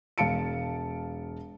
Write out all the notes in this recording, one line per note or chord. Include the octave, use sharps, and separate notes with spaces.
E1 F5 A5 C#7 D7